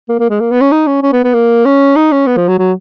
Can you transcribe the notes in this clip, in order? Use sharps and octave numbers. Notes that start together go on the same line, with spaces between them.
A#3
A#3
G#3
A#3
B3
C#4
D#4
C#4
C#4
B3
B3
A#3
C#4
D#4
C#4
B3
F3
F#3
F#3